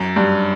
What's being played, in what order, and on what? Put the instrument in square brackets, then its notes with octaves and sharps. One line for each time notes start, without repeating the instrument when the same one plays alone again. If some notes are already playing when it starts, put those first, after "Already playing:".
Already playing: [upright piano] F#2
G2